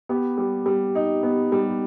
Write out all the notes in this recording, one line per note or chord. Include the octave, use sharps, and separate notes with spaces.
B3 G4
G3
G3
D#4
B3
G3